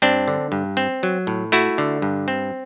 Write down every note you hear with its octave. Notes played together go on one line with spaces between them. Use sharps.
G2 C4 D4
D3
G2
C4
F#3
A2
A3 E4 F#4
D3
G2
C4